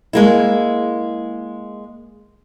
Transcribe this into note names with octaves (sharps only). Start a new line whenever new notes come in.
G#3 A#3 E4